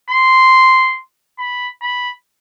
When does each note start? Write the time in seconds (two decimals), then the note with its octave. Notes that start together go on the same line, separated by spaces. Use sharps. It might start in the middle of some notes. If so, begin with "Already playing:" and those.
0.10 C6
1.39 B5
1.82 B5